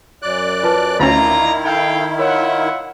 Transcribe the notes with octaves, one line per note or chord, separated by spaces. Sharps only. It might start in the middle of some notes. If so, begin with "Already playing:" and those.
F#2 D5 F#6
F4 B4 A5
D2 D#3 C#4 D4 E4 F4 A#5 A6
A4 F5 G5 G#6
F4 A#4 C#5 D#5 E5 F#5